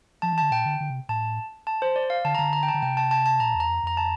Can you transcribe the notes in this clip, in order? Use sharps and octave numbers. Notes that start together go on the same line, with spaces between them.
F3 A5
E3
A5
D3
A#2 G5
D3
D3
C3
A2 A5
A5
C5
D5
F5
D3 A5
A#5
D3 A5
A#5
G5
A5
D3
C3 G5
A5
A5
A5
A#2 A#5
E2
A#5
F2
F2 A#5
A5